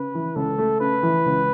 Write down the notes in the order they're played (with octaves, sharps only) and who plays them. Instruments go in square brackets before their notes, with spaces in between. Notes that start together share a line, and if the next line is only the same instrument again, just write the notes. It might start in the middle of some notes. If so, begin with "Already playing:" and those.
Already playing: [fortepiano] C#3 [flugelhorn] B4
[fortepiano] E3
[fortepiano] C#2 [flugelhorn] A4
[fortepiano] A3
[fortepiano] C#3 [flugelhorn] B4
[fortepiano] E3
C#2